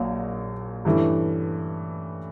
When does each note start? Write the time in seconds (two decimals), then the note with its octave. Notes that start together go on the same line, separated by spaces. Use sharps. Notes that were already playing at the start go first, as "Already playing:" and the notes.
Already playing: A#1 A#2 F#3 F5
0.85 G2 E3 A3 C#4